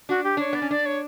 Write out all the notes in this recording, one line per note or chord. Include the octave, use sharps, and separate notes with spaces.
D4 F#4
G4
D4 C#5
B3 D5
C#4
D4 D5
C#5